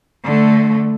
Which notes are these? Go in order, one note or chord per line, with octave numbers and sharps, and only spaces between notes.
D3 A3